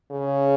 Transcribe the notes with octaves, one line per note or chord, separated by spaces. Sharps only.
C#3